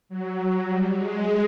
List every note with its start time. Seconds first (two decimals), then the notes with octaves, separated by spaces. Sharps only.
0.09 F#3
0.68 G3
0.98 G#3